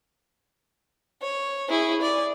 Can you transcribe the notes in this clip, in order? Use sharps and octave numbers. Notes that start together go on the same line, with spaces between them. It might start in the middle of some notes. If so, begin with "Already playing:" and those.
C#5
E4 G#4
D5